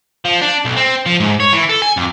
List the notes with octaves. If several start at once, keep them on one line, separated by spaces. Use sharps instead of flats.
F3
D4
B1
C4
F3
G#2
C#5
E3
A4
G#5
F2